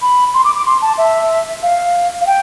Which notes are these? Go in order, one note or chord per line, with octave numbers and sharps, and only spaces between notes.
B5
C6
D6
D6
C6
A5
E5
F5
F5
G5